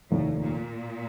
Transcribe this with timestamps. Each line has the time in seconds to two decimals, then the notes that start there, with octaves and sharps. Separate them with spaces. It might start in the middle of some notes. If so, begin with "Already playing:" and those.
0.10 F1 D#2 A2 D#3
0.41 A#2